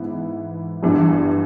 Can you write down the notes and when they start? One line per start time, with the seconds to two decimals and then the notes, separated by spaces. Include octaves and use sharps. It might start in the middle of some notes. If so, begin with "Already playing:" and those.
Already playing: G#2 E3 B3 E4
0.83 G1 G2 E3